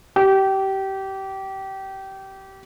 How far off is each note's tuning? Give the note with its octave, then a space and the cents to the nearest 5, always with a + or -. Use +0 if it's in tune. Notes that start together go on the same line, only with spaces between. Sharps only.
G4 -25